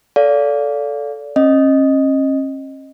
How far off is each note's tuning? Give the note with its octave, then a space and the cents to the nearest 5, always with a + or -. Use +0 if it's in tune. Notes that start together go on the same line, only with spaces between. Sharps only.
A4 +0 D5 -30 F5 +0
C#4 -40 D#5 +0